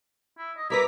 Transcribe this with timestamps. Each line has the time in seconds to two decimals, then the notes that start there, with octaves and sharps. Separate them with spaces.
0.38 E4
0.57 D#5
0.70 G3 E4 A#4 B4 A#5 D6 B6